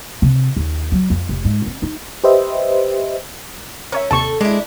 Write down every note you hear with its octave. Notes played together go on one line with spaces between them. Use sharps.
C3
D#2
F#3
F2
F1
G#2
C4
D#4
G4 B4 C5 D#5 E5
C#4 A#4 C#5 E5
D#2 C3 A4 A5 C#6
G#3 D4 E4